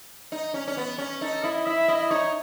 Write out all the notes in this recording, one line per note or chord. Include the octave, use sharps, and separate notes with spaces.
D#4
C#4
C#4
B3
C#4
D#4 A4
E4 D#5
E4 E5
E4 D#5
D#4 C#5